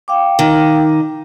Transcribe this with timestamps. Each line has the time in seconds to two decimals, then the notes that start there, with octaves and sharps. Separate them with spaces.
0.08 F5 G5 D6
0.39 D#3